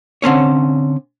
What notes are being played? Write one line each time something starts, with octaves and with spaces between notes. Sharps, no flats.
D3 C4 C#4 C#5